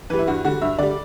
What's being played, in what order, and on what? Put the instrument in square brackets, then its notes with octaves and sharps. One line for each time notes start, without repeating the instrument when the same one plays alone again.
[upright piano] E3 G3 B4
E4
G2 F#4
D3 G3 F#4
G2 E5
D3 G3 D5